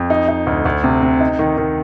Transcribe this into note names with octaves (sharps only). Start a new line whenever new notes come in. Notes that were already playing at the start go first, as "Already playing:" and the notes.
Already playing: F2
D#4
D#4
D2
D2
C3
C3
D#4
D#3
D#3